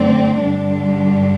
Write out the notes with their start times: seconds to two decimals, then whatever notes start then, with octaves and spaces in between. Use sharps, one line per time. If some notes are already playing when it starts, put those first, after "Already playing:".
Already playing: F#2 D3 A3 C4 D5
0.40 G2 D3 G3 D4